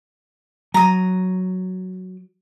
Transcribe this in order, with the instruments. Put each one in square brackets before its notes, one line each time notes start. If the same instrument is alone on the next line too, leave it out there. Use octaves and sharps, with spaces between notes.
[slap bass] F#3 [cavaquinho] A#5 D#6